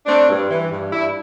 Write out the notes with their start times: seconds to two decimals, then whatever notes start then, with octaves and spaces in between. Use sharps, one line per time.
0.06 A3 C4 D4
0.28 G2
0.50 E3
0.71 G2
0.92 G2 D4 E4